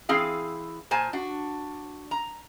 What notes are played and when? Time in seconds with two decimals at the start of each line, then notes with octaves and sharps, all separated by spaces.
0.09 E3 C4 G#4 F5
0.91 A#2 C5 G#5 A5
1.13 D4 F#4
2.11 A#5